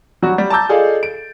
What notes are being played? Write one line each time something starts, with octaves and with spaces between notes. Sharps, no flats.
F#3 G3 F#4
G3
A5 A#5 D6 E6 G6 A6
F4 G#4 A4 D5 D#5 F5
D7